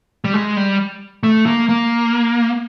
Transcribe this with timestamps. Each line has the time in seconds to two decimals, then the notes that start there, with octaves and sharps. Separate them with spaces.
0.25 G3
0.34 G#3
0.57 G3
1.23 A3
1.46 A#3
1.69 A#3